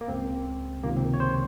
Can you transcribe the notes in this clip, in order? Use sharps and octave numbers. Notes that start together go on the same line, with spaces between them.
A#3
C#2 C#3 C4
C#2 C3 D#3 A#3
C4
C#5
C5